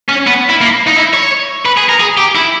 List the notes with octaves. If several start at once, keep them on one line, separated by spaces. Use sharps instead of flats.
C#4
B3
E4
A#3
D#4
E4
C#5
B4
G#4
A#4
G#4
G4
E4